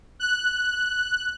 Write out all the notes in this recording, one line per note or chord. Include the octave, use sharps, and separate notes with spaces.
F#6